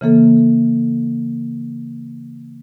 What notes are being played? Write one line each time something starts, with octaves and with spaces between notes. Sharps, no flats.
C#3 E3 A#3 A4